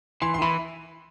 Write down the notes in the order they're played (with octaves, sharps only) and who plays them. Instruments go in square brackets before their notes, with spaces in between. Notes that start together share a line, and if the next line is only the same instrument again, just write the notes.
[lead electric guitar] E3 [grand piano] C6
[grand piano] C6
[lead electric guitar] D#3
[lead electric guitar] E3 [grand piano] B5